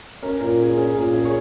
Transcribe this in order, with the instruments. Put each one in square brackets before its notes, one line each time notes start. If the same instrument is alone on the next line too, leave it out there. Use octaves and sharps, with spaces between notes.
[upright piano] C#4 [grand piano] A#4
[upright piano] A#2 [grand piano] A#4
[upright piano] C#4 [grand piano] G#4
[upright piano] C#4 [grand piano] G#4
[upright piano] A#2 [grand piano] A#4
[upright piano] C#4 [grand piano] G#4
[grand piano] C#5